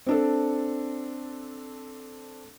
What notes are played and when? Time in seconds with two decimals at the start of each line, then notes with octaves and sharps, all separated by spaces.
0.07 C4 D4 A4